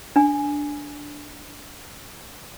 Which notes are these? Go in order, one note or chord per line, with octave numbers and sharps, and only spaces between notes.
D4 G#5